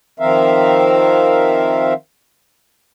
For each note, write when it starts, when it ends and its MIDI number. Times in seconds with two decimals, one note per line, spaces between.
0.20 1.93 51
0.20 1.93 53
0.20 1.93 60
0.20 1.93 70
0.20 1.93 76
0.20 1.93 77